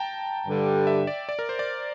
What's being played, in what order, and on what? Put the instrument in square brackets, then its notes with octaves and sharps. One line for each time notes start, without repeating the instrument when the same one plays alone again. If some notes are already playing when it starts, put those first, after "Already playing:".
Already playing: [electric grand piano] G5 A5 A#5
[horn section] G2 D3 G3
[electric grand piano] E5
D5
D5
A#4
C5
D5